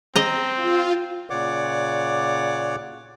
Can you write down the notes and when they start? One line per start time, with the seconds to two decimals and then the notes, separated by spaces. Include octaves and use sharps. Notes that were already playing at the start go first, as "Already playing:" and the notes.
0.16 C4 D#5 A#5
0.56 F4
1.30 A#2 C#3 C#5 D5 F#5 D6